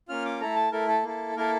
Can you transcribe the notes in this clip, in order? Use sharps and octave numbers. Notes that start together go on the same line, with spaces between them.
A#3 C#4 F4 F6
D6
A3 E4 A4 A#5
A5
A3 E4 A4 A#4
A4
A#3 E4 A4
A#3 E4 A4 A#4